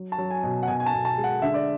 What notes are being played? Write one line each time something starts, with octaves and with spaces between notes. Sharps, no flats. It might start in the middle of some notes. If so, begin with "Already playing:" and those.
Already playing: F#3
A5
F#3
G#5
B2
F#5
B2 G#5
G#5
A5
B2
A5
G#3
F#5
D3 E5
D5